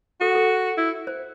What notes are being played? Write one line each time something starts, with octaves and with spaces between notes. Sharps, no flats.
F#4 A4
A4
E4
C5